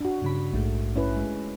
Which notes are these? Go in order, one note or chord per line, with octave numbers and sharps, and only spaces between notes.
D4 F#4
G2 C#3 B5
A#1 G#2 A3
C#4 E4 B4
G#3